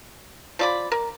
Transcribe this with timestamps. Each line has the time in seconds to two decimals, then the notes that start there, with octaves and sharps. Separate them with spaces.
0.59 F3 D5 B5
0.92 A#4